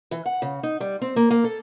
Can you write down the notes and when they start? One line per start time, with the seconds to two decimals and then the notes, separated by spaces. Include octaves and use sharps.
0.11 E3
0.26 F#5
0.42 C#3
0.63 D#4
0.80 G3
1.01 C4
1.16 A#3
1.30 A#3
1.44 A4